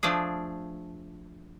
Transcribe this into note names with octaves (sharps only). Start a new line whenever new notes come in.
F3 A3 D4 G#4